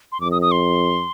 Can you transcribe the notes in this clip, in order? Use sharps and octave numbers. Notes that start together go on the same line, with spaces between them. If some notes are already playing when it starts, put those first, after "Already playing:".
C6
F2 D6
D#6
D#6
C6